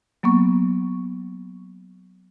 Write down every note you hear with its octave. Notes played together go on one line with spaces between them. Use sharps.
F#3 A#3 B3 C#6